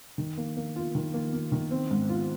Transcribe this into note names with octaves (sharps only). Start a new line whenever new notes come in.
D#3
A#3
A#3
F4
D#3
A#3
A#3
D#3
C4
G#2
F4